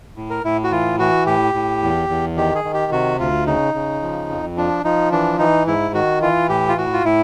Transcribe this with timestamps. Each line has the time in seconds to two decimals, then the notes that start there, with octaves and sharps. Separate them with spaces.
0.17 A2
0.30 A#4
0.44 A2 E4
0.64 F#4
0.71 E3 F4
0.99 E3 F#4
1.26 A2 G4
1.54 A2
1.82 E2
2.09 E2
2.37 D#3 G4
2.55 G#4
2.64 D#3
2.74 G4
2.92 C3 F#4
3.19 D2 F4
3.47 C#3 D#4
3.74 C#3
4.02 F3
4.29 F2
4.57 F3 D4
4.84 F3 D#4
5.12 E3 D4
5.39 E3 D#4
5.67 G#2 E4
5.94 D#3 F#4
6.22 E3 F4
6.49 A2 G4
6.69 F4
6.77 A2 F#4
6.93 F4
7.04 A2 E4